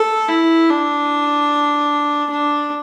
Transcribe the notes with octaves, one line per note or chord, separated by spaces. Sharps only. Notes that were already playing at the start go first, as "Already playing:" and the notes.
Already playing: A4
E4
D4
D4